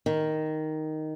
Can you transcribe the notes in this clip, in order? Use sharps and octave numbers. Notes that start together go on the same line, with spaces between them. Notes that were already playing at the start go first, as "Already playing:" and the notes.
D#3